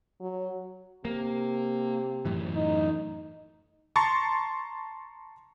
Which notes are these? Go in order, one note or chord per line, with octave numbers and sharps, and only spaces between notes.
F#3
C3 A#3
F#2 A2 E3
D#4
A5 A#5 C6 C#6 A6